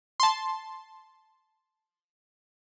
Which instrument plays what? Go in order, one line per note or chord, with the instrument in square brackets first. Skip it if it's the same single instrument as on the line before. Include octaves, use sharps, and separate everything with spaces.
[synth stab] A5 C6